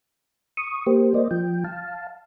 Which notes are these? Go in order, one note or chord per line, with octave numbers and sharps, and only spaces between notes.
C#6 D#6
A#3 G4 C5
A#3 C5 D5 D#5
F3 G5
F5 A5